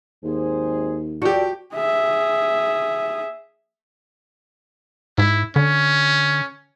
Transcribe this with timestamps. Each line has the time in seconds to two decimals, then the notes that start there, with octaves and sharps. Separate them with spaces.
0.24 G#1 D#2 G#4 C5
1.22 F3 F#4 G4 A4 D5
1.74 G#4 E5
5.18 G#2 E4
5.56 D3 C#4